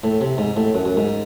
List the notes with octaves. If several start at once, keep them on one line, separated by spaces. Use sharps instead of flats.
A2
C3
G#2
A2
F#2
F#2
G#2